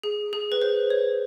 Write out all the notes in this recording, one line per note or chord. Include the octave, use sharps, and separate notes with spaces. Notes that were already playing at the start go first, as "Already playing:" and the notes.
G#4
G#4
B4
C5
C#5